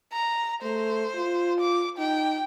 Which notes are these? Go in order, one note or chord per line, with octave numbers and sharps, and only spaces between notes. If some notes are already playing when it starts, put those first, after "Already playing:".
A#5
A3 C5
F4
D6
D#4 G5